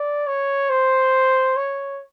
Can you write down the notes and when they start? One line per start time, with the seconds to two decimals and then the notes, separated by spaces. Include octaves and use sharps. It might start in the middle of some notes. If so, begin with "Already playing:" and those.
Already playing: D5
0.27 C#5
0.69 C5
1.56 C#5